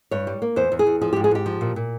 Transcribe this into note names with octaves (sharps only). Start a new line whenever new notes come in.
G2 C#5
G3
A#3
E2 C5
E2
G#4
E2
F3 G#4
G4
G#2
G#4
G#2 G4
F3
A#2
A#2